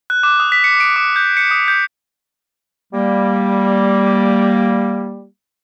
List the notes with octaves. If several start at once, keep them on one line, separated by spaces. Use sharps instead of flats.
F#6
D6
D#6
B6
C#7
D7
D6
G6
C#7
D#6
G6
G3 A#3